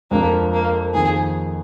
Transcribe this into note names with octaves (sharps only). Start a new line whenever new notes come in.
F2 F3 G#3 A#3 D4 F4
A#3
F2 D#3 A#3 G#4